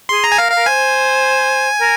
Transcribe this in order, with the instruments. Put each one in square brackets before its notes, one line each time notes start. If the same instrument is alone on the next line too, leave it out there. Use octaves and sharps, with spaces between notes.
[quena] G#4 [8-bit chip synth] C6
[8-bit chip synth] A#5
G#5
[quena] A#4 [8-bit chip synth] F5
[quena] A#4 [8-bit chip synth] F5
[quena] C5 [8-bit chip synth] G#5
[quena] A#4